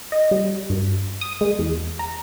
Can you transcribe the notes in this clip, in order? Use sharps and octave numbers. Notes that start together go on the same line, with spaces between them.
D#5
G3
G2
D#6
G#3
E2
A#5